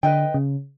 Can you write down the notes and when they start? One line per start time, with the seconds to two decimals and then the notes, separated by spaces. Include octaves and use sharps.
0.03 D3 B4 D#5 G5
0.34 C#3